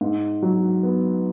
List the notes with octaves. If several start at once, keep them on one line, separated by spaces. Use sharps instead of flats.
G#2
F#3
B3